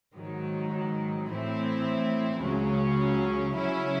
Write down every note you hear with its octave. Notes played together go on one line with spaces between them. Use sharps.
G#2 D#3 F#3
A2 E3 C4 E4
C#2 C#3 F#3 C#4
C#3 F#3 C#4 E4